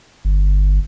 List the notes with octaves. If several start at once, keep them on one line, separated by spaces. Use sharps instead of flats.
G1